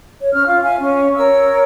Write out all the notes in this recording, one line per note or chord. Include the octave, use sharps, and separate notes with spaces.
C#5
C#4 F6
F4 F5
E5 F5 G#5
C#4
A#4 C#5 E6